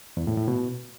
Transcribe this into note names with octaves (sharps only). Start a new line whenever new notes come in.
E2
A2
A2
B2